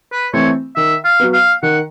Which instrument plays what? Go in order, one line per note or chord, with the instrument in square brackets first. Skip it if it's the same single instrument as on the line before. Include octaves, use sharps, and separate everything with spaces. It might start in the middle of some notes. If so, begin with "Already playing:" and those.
[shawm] B4
[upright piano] E3 A3 C4 [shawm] C#5
[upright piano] D#3 [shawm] E5
[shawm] F5
[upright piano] F#3 B3
[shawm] F5
[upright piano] D#3 [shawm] F#5